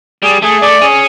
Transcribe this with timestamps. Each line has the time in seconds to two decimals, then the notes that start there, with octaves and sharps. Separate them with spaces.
0.23 G3 G#4
0.42 A3 G#4
0.62 A3 D5
0.82 C#4 G#4